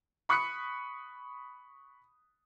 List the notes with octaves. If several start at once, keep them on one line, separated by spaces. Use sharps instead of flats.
B5 C#6 D#6 F#6 B6 C#7